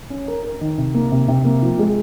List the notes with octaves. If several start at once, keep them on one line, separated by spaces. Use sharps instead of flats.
C#4
A#4
A#4
D#3
C3
A#3
C3
C3
A#3
F3
G#3